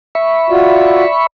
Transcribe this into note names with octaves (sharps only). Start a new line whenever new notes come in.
E5 B5 C#6
F4 F#4 D5